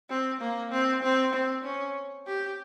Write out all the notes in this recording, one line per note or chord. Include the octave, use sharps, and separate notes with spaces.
C4
A#3
C4
C4
C4
C#4
G4